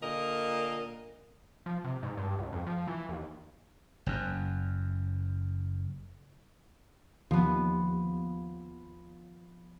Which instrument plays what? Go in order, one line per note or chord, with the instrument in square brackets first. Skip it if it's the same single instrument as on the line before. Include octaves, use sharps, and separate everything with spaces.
[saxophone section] A#2 D3 A#4 D#5
[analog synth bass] F3
C3
G#2
G2
C#2
F2
F3
E3
D#2
[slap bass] F#1 F#2
[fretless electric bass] D#2 [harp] F3 B3